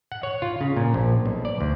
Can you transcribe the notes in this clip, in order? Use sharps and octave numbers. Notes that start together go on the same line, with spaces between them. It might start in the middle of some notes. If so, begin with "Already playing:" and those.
F#5
C#5
F4
C#3
A#2
A#1
B1
D5
D2